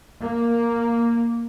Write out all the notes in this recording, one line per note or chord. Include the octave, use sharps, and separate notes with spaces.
A#3